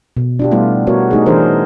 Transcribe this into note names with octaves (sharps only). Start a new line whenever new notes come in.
B2
D4 F4 G4
G3 A3 B3 E4 F4
B3 F#4 A#4 C#5
A3 D#4 G#4
E3 D4 G#4 A#4 C5